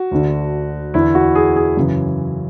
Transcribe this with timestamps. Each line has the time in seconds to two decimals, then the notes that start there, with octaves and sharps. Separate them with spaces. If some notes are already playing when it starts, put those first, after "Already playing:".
Already playing: F#4
0.11 D2 D3
0.94 E2 D3 E4
1.15 F#4
1.35 G#4
1.56 G#4
1.77 F#2 C#3 E3